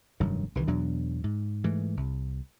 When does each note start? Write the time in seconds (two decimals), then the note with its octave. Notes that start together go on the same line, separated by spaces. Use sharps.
0.20 F1 G2 D#3 F#3
0.55 C2 C3 D#3 E3
0.67 E2 B2 F#3 D4
1.24 G#2
1.64 G#2 E3 A3
1.97 C2